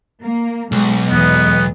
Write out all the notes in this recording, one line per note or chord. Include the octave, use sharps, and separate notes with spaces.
A#3
B1 G#3
E2 G#3 B3 D#5